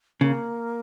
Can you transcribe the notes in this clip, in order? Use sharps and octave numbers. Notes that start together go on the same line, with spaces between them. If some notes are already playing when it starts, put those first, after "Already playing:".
C#3 A#3